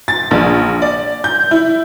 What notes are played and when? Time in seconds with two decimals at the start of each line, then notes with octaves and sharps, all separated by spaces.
0.08 A6
0.31 A#1
0.82 D5
1.24 G6
1.51 E4